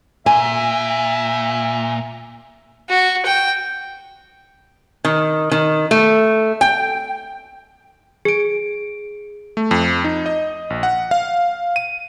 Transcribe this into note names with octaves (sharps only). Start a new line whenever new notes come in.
A#2 E5 G#5
F#4
G5
D#3
D#3
A3
G5
G#4 D7
A3
F2
D#4
D#5
A#1
F#5
F5
D#7